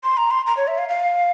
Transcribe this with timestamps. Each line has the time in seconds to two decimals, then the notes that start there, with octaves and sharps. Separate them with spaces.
0.04 C6
0.17 A#5
0.31 C6
0.47 A#5
0.57 C#5
0.68 E5
0.78 F5
0.89 F5